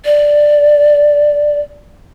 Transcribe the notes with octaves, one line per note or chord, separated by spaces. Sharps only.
D5